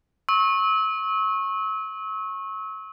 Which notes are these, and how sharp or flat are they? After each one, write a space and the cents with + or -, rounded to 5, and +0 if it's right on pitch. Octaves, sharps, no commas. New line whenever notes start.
C#6 -25 E6 -35